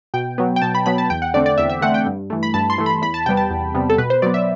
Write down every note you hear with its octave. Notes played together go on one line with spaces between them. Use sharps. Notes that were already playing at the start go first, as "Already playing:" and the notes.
B2 G5
F#3 B3
G5
B2 A5
B5
F#3 B3 B5
A5
E2 G5
F#5
D3 A3 C4 D5
D5
E2 E5
E5
D3 A3 C4 F#5
G5
G2
E3 A3
B5
G2 A5
C6
E3 A3
B5
E2 B5
A5
C3 G3 B3 G5
A5
E2
C3 G3 B3
A4
B2 B4
C5
F#3 B3 D5
E5